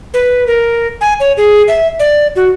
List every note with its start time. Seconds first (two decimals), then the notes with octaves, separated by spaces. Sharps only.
0.14 B4
0.47 A#4
1.01 G#5
1.20 C#5
1.37 G#4
1.68 E5
1.99 D5
2.36 F#4